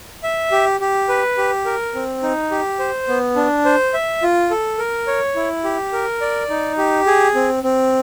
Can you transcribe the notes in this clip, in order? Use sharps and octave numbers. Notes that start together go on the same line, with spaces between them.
E5
G4
G4
B4
G4
A#4
C4
D#4
G4
C5
B3
D4
C5
E5
F4
A4
A#4
C#5
E4
G4
A#4
D5
D#4
G4
G#4
C4
C4